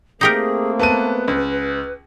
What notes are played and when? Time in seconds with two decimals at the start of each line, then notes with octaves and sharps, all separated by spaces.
0.21 A3 A#3 C4 D#4 G4 G#4 A#4
0.79 B3 B4 A5 D#7
1.28 C#2